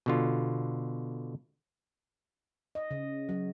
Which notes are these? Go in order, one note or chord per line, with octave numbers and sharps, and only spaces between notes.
B2 D3 F4
D#5
C#3
F#3